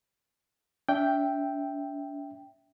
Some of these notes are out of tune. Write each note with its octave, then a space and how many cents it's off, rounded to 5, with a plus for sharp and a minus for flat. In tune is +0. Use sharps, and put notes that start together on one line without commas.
D4 -40 E5 +0 G5 +0